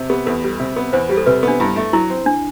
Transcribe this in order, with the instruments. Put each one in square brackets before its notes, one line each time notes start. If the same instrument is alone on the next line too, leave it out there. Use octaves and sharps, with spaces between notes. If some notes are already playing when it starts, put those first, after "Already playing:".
Already playing: [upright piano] C3
[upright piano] B3 [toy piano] G4
[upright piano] E2 [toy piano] A4
[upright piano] G3
C3
B3
[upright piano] E2 [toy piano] C5
[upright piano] G3 [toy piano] G4
[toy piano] A4
[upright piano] C3 [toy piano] B4
[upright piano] B3 [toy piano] D4
[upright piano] G2 [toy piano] E4
[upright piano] A3
[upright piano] F#3 [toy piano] E4
[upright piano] C4
[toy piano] D4